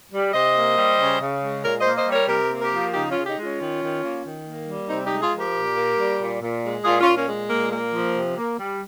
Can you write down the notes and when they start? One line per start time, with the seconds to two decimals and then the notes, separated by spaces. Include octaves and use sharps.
0.12 G3
0.33 C3 C5 D#5
0.55 A#3
0.77 G3
0.98 C#3
1.20 C#3
1.42 G#3
1.63 A#2 A#4 C#5
1.80 C5 D#5
1.85 A#3
1.96 C5 D#5
2.07 G3
2.12 A#4 C#5
2.28 C3 G4 A#4
2.51 A#3
2.61 G4 A#4
2.72 F3
2.93 C#3 D#4 G4
3.10 C#4 F4
3.16 C#3
3.26 D#4 G4
3.37 G#3
3.43 C#4 F4
3.60 D#3
3.81 D#3
4.03 A#3
4.24 D#3
4.46 A#3
4.67 G3
4.89 C3 C4 D#4
5.05 D#4 G4
5.11 G#3
5.22 F4 G#4
5.33 F3
5.38 G4 A#4
5.55 A#2
5.76 A#3
5.98 G3
6.20 A#2
6.41 A#2
6.63 G#3
6.85 A#2 F4 G#4
7.01 C#4 F4
7.07 A#2
7.17 A#3 C#4
7.28 G#3
7.50 A#2 A#3
7.72 A#3
7.93 F3
8.15 C3
8.37 A#3
8.58 G3